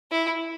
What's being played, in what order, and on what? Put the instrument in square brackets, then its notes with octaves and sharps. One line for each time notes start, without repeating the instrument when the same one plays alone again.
[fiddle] E4